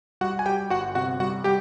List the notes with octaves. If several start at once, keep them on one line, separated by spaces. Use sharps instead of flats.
G3 F#4 F#5
G#5
G3 G4 G5
G1 F#4 F#5
C3 F#4 F#5
G3 F#4 F#5
G3 G4 G5